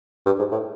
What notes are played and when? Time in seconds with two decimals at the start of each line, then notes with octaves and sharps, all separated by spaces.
0.26 G2
0.39 G#2
0.52 A2